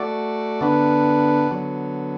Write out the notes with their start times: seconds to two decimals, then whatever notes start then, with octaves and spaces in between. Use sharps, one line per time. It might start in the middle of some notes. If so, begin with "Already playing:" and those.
Already playing: A3 F#4 D5
0.61 D3 B3 D4 B4
1.51 D3 F#3 B3